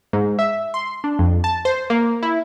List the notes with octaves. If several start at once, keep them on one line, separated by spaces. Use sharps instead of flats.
G#2
E5
C6
D4
F2
A5
C5
A#3
E4